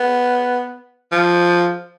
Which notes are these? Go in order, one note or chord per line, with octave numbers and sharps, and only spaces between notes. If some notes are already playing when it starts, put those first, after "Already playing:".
Already playing: B3
F3